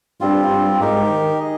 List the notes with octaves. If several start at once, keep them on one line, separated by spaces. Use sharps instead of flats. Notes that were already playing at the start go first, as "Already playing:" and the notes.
G2 G3 C4 F4
G2
G#2 D#4 G4 A#4
D#3
G#4 D#5